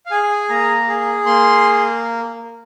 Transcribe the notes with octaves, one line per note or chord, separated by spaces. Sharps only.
F5
G#4 G#5
A#3 A#5
G#4
A#3 C6